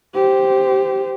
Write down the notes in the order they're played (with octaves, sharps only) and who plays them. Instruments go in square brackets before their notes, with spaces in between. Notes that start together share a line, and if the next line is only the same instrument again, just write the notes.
[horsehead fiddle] G4 C5